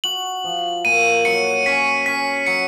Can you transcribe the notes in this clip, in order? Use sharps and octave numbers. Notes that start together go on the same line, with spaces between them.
F#4 F#7
F3
A#2 D#7
F#3 C#7
C#4 B6
C#4 B6
F#3 C#7